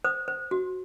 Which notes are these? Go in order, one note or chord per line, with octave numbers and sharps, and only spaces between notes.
C5 D#6
C5
F#4